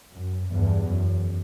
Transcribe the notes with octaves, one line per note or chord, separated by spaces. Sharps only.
F#2
E2 G2
F#2